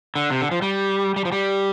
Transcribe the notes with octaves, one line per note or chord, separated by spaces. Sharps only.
D3
C3
D3
F3
G3
G3
F3
G3